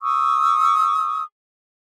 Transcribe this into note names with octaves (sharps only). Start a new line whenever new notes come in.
C#6 D#6 E6